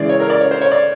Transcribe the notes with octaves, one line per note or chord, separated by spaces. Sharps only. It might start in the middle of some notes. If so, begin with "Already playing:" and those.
Already playing: C#3 E3 G#3 D5
C#5
A#4
D5
C#5
C5
C#5
D5